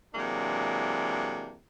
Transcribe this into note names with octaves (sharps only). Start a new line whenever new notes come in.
C3 E3 F#3 G#3 A#3 D4